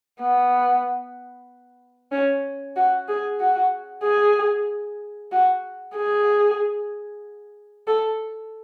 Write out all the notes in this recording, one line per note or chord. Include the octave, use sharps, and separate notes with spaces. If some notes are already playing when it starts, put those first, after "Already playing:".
B3
C#4
F#4
G#4
F#4
G#4
F#4
G#4
A4